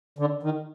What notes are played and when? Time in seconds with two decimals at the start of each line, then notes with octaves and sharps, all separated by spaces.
0.19 D3
0.43 D#3